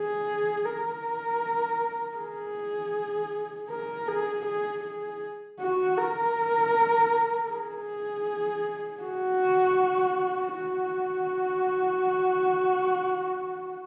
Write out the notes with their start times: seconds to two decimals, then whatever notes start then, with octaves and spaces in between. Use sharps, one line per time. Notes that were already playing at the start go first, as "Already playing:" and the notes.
Already playing: G#4
0.65 A#4
2.18 G#4
3.70 A#4
4.08 G#4
4.46 G#4
4.84 G#4
5.60 F#4
5.98 A#4
7.50 G#4
9.03 F#4
10.55 F#4